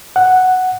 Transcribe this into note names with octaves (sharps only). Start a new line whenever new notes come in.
F#5